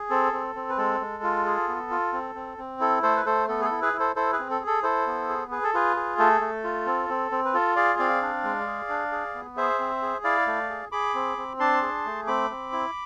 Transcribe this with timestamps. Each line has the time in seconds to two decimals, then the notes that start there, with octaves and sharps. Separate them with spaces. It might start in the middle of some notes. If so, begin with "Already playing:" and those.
Already playing: G#4
0.10 C4 A4
0.33 C4
0.55 C4
0.69 B4
0.78 G#3 A4
1.00 G#3
1.23 F4
1.46 G#4
1.68 B3
1.91 F4
2.13 C4
2.35 C4
2.58 C4
2.80 E4 A4
3.03 A3 A4 C5
3.17 B4
3.26 A3 A4 C5
3.48 B3 A4
3.61 G#4
3.65 A4
3.71 E4
3.82 G#4 B4
3.93 E4
3.99 A4 C5
4.16 E4 A4 C5
4.33 G#4 B4
4.39 C4
4.50 A4
4.60 G#4
4.67 A4
4.83 E4 A4 C5
5.06 B3
5.29 G#4
5.51 G#4 B4
5.63 A4
5.74 F4 G#4 B4
5.96 G#4
6.19 A3 A4
6.41 A3
6.64 F4
6.86 C4
7.09 C4
7.31 C4
7.45 B4
7.54 F4 A4
7.76 G#4 D5 F5
7.99 C4 D5 F5
8.22 D4
8.44 G#3
8.66 G#4
8.89 D4
9.12 G#4
9.35 B3
9.57 G#4 C5 E5
9.79 C4
10.02 G#4
10.24 E4 D5 F5
10.47 A3
10.70 G#4
10.92 G#4 B5 D6
11.15 C4
11.37 C4
11.59 D4 A5 C6
11.82 G#4
12.05 A3
12.27 C4 B5 D6
12.50 C4
12.72 E4